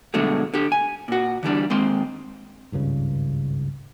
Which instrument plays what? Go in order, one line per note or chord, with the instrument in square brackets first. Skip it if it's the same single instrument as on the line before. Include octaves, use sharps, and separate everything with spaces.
[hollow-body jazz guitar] G2 B2 D3 F#3 G#3 A3
D3 G4
G#5
A#2 F#4
D3 E3 G3 D4
D#2 G#3 C4 C6
[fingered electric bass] G#1 C#2 G2 C#3